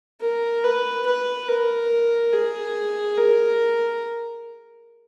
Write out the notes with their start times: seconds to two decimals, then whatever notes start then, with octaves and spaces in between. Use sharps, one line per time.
0.21 A#4
0.64 B4
1.06 B4
1.48 A#4
2.33 G#4
3.17 A#4